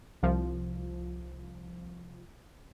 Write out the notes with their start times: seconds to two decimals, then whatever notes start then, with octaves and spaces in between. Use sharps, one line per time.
0.23 C2 F3